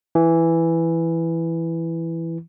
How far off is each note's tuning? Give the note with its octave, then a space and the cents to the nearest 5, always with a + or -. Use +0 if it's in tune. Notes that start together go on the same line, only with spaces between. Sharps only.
E3 +5